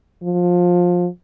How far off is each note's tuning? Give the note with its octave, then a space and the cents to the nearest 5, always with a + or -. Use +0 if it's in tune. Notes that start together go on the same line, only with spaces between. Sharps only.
F3 +20